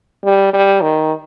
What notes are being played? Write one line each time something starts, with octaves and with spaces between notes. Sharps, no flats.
G3
G3
D#3